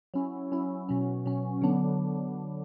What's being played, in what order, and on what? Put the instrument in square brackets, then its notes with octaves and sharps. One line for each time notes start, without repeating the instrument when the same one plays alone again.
[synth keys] F#3 C#4 E4
F#3 C#4 E4
B2 F#3 C#4
B2 F#3 C#4
D3 F#3 B3 D4